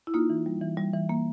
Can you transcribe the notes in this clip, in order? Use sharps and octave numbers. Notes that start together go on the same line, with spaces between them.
E4
A#3 D#4 F4
E3
G3
E3
G3
E3
A#3